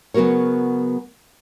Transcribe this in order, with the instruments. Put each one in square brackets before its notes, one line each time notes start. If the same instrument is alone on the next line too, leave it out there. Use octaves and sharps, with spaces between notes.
[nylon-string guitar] C#3 F#3 B3 F#4 A#4 C#5